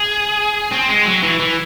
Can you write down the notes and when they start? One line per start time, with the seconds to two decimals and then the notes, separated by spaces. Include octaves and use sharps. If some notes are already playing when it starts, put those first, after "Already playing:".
Already playing: G#4
0.72 C4
0.89 G#3
1.06 F#3
1.23 E3
1.40 E3